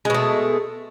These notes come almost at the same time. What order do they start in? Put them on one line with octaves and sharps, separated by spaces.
G#3 B2 A3